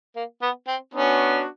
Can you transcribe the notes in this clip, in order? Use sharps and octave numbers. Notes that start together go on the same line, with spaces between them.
A#3
B3
C4
B3 C#4 D4 F#4